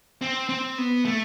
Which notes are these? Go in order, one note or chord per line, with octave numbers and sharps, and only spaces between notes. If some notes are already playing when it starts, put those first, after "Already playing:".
C4
C4
B3
A3